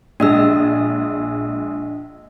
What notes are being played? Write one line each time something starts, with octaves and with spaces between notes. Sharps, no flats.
A#1 G#3 D4 D#5 E6